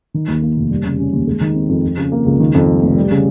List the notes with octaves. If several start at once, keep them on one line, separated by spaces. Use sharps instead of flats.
D#3
D#2
A#3
F1
G3
C#3
C#4
D#2
G#3
D#3
C4
F2
F3
C#3
A#3
C#2
D#3
F2
G3
F1
G3
C#3